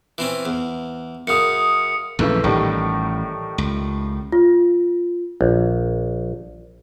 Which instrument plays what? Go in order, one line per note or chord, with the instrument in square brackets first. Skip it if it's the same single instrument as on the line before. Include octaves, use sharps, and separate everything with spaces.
[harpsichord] E3 C4 C#4
E2
[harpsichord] F#2 C#3 [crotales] D#6 C#7
[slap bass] A#1 F#2 [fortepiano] C#3 E3 A3
[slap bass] A1 [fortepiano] A2 D#3 G3
[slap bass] C#2
[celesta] F4
[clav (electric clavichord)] A#1